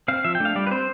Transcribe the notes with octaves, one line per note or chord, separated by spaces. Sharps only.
C4 F5
F3 E5
G5
A3 D4 F5
G3 D5
B4
C4 C5